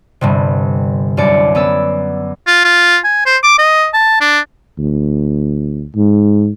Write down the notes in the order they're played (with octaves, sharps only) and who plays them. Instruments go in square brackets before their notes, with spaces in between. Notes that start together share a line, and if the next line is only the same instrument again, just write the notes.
[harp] G1 G2 C3
C2 F#2 D4 D5 C#7
B3 C#4 D5 E6
[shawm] F4
F4
G#5
C5
D6
D#5
A5
D4
[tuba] D2
G#2